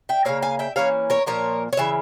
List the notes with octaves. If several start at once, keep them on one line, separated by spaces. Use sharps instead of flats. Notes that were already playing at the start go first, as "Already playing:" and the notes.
E5 G5
C#3 E3 A#3 C#5 F5
F5 G#5
E5 G5
E3 A#3 C#4 C#5 F5
A#4 C#5
A#2 F3 A#3 A#4 C#5
C#5
C#3 E3 E5